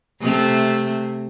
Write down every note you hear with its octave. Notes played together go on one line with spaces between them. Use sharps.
C3 A3